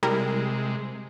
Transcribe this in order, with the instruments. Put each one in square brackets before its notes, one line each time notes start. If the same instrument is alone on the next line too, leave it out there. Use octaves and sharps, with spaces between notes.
[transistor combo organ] C3 G#3 [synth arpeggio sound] G3 E4 A#4